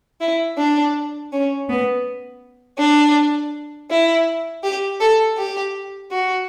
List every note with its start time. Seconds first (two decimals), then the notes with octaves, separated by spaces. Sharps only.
0.21 E4
0.58 D4
1.32 C#4
1.69 B3
2.79 D4
3.90 E4
4.64 G4
5.01 A4
5.38 G4
6.12 F#4